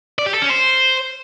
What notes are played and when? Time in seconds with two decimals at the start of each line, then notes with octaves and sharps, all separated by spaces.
0.19 D5
0.26 G4
0.34 A4
0.42 C#4
0.50 C5